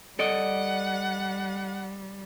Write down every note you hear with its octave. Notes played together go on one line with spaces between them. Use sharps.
G3 A4 D5 D#5 F#5